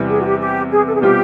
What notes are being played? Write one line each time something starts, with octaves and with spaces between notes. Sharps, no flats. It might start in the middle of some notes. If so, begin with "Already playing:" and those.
Already playing: E2 C3 E3 G3
G#4
F#4
G4
G4
G#4
A4
G#4
B2 G3 C4 F4 G4